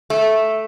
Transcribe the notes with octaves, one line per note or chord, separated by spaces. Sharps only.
A3